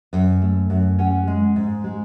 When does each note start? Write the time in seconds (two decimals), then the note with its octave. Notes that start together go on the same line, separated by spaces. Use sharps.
0.13 F#2
0.42 A3
0.70 F#2
0.98 C#4 F#5
1.27 G#3
1.56 G#2
1.84 G#3